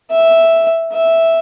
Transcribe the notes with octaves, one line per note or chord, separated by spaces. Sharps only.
E5
E5